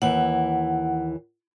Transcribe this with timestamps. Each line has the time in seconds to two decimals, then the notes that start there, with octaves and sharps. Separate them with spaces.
0.02 D#2 E3 F#5